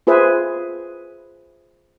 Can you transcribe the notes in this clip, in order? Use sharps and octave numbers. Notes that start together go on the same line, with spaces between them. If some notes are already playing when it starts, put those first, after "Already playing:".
F4 G#4 B4 C5 E5